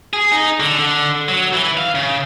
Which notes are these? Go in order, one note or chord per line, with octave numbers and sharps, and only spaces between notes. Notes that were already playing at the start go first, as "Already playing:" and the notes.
G#4
D#4
D3
D3
F#3
E3
F5
C#3